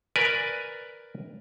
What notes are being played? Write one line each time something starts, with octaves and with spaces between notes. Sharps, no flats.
A#4 B4 D5 G#5